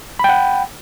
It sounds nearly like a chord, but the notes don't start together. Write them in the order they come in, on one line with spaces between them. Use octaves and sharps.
B5 G5 F#5